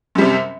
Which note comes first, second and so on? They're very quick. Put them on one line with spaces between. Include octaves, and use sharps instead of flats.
F#2 G3 C3